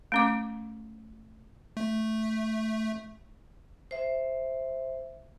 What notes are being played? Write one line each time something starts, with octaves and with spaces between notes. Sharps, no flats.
A3 C#4 D6
A3
C5 E5